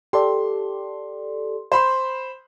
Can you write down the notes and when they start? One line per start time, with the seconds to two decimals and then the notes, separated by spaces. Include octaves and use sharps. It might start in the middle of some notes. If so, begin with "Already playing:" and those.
0.13 G4 A4 D5 C6
1.72 C5 B5 C6